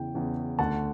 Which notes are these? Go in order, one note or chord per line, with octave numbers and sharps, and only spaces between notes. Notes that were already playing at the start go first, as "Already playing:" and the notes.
Already playing: E2 C#3 E3 G5
E2 C#3 E3
D2 D3 F#5 A5